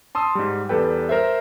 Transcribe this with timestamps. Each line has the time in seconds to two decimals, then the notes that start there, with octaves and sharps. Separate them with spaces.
0.15 A5 C6 D#6 E6
0.35 G#2 G3
0.69 E2 G3 A4 B4 G5
1.09 A#4 C5 E5